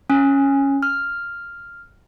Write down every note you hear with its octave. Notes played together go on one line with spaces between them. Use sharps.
C#4
F6